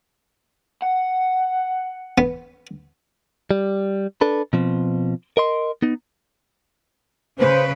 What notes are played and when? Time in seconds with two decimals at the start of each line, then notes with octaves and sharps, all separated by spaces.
0.82 F#5
2.18 B3
3.51 G3
4.21 D4 A4 B4
4.53 B2 F3 C4
5.37 A#4 D#5 C6
5.82 B3 D#4
7.39 C#3 B4 C5